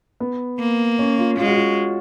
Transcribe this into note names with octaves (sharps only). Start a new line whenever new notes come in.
B3
A#3
C#4
F4
G#3 F4
F#4
F4